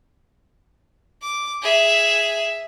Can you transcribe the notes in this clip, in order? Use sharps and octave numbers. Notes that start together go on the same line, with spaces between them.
D6
G#4 E5